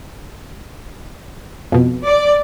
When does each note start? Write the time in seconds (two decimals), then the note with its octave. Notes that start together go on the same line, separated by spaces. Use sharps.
1.72 F2 B2
2.06 D5